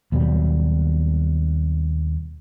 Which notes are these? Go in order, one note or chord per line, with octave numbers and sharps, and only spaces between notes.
D#2 B2 F#3 G3